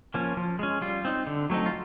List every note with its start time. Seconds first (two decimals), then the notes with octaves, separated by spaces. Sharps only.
0.14 F3 A#3 C#4
0.37 F3
0.59 G#3 C#4
0.81 G3 F4
1.05 C4 D#4
1.27 D3
1.50 F#3 A3 C4 D#4
1.66 F4